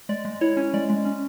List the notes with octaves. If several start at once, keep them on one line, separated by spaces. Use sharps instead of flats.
G#3 D5
G#3
E4 C#5
C#4
G#3 D5
G#3
C#4